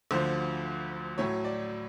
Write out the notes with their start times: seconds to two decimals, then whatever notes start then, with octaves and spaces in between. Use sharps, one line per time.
0.11 D2 D3 F3 C5
1.18 A2 F#3 A3 C#5
1.44 D5